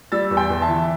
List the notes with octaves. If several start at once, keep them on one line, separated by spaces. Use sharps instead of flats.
G3 E6 A6
E2
G5 C6
E2
E5 A5
E3